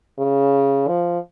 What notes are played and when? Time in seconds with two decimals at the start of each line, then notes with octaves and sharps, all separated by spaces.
0.19 C#3
0.88 F3